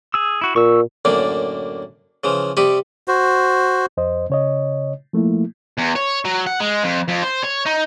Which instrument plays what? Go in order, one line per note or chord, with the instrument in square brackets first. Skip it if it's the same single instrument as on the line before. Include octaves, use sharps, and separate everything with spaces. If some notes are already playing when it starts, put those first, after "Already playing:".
[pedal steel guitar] G#4 E6
E4 F#4
[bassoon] A#2 [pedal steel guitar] C#6 E6
[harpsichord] F#2 A2 D3 A#3 D5
C#3 E3 F3
C3 G3 G4 D#5 B5 C#6
[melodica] F#4 C5
[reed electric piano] F2 C5 D#5
C#3 C#5 D#5
F3 A3 A#3 E4
[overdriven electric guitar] E2
C#5
F#3
F#5
G#3
F2
F2
C5
C#5
D#4